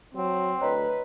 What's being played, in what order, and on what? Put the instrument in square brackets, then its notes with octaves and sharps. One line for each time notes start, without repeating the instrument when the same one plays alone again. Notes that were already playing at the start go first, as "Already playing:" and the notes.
[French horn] F#3 [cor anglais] C4
[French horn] D2 [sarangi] B4 [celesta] C#5 D#5 A#5